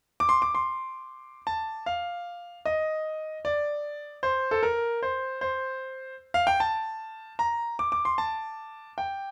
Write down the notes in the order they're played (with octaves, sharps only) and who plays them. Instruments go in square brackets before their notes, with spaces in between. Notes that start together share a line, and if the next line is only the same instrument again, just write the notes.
[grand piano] D6
C6
D6
C6
A5
F5
D#5
D5
C5
A4
A#4
C5
C5
F5
G5
A5
A#5
D6
D6
C6
A5
G5